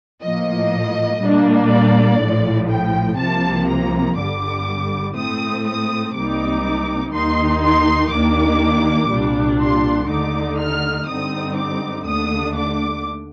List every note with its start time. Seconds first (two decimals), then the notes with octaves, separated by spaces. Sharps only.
0.23 A2 F3 A#3 D#5
1.22 A#2 G3 A#3 D4
1.71 D5
2.20 A#1 A2 F3
2.70 G5
3.19 C2 C3 F3 A#3 A5
3.69 A#5
4.18 G1 G2 D3 G3 D6
5.16 A2 A3 C4 D#6
5.66 D#6
6.15 C2 C3 G3 A#3 D#4 D6
7.13 D#2 D#3 A#3 D#4 C6
7.63 C6
8.12 D#2 D#3 A#3 D4 D6
9.11 C2 A#2 G3 D4
9.61 C6
10.09 D#2 D3 A3 D#4 D6
10.58 F6
11.08 G2 D3 G3 C4 D#4 D#6
11.57 D6
12.07 D#2 D3 A3 D4 D#6
12.56 D6